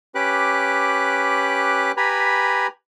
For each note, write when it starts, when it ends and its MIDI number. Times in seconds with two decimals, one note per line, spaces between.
0.15 1.92 61
0.15 1.92 67
0.15 1.92 71
0.15 1.92 86
0.15 1.92 90
1.97 2.67 67
1.97 2.67 71
1.97 2.67 80
1.97 2.67 82
1.97 2.67 83